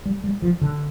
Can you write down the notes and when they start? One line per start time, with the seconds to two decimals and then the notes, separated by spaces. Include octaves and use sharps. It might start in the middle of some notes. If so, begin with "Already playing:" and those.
0.05 G3
0.24 G3
0.42 F3
0.61 D3